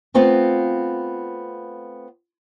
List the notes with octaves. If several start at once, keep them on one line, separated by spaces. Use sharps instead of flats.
A3 B3 C4 F4